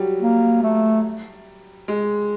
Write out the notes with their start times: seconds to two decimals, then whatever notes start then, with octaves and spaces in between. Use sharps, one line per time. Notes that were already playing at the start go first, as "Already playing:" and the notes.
Already playing: F#3 G3
0.22 A#3
0.63 A3
1.88 G#3